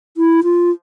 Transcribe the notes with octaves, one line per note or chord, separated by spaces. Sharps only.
E4
F4